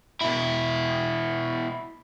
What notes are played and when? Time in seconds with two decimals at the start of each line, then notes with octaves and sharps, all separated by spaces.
0.21 B2 E4